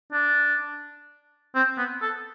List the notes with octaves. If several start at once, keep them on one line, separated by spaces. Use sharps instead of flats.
D4
C4
B3
A4